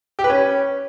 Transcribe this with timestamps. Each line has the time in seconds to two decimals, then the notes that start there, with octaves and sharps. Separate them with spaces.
0.19 G4
0.24 B4
0.30 C#4